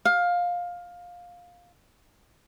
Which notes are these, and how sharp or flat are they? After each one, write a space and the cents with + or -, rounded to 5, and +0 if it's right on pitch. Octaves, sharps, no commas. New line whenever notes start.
F5 +15